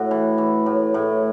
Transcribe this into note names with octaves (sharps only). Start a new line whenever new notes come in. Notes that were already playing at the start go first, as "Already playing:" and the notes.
Already playing: A2 F#4
E3
E3
A2
A2